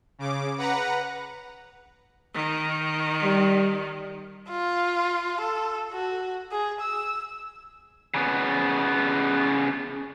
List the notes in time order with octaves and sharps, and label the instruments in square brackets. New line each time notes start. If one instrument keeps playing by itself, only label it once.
[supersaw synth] C#3 D6
B4 F#5 A#5
[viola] D#3
[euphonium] G3
[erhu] F4
A4
F#4
G#4
E6
[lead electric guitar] C#3 B3